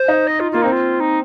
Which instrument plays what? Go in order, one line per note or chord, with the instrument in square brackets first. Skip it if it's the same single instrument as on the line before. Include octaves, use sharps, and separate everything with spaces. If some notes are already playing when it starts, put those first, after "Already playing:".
Already playing: [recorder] C5
[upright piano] D#4
[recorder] D#5
F4
[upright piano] A#3 [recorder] F4
[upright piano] C4 [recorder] D#4
[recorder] F4
D#4